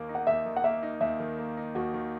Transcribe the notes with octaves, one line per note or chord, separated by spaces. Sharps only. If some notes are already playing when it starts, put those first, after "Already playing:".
Already playing: D#2 D#3 A#3
D#4
F#5
D#2 E5
D#3
F#5
A#3 E5
D#4
D#2 E5
D#3
A#3
D#4
D#2 F#4
D#3